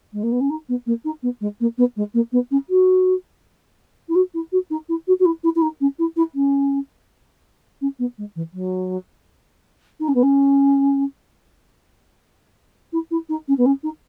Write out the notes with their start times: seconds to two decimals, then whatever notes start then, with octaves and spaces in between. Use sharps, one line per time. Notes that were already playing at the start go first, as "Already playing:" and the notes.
0.13 G#3
0.23 A#3
0.32 B3
0.40 C#4
0.50 D#4
0.69 B3
0.86 A#3
1.05 D#4
1.22 B3
1.41 G#3
1.60 A#3
1.78 B3
1.96 G#3
2.14 A#3
2.32 B3
2.51 C#4
2.69 F#4
4.09 E4
4.15 F#4
4.34 E4
4.52 F#4
4.70 D#4
4.89 E4
5.07 F#4
5.19 F#4
5.25 E4
5.43 E4
5.55 E4
5.62 D#4
5.80 C#4
5.99 E4
6.16 E4
6.35 C#4
7.81 C#4
7.99 B3
8.18 G#3
8.36 E3
8.53 F#3
10.00 D#4
10.08 C#4
10.14 B3
10.23 C#4
12.93 E4
13.11 E4
13.29 D#4
13.48 C#4
13.58 B3
13.66 C#4
13.83 D#4